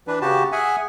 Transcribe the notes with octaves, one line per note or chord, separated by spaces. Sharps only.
E3 D4 B4
C#3 F#4 G4 A5
G#4 E5 F#5 G#5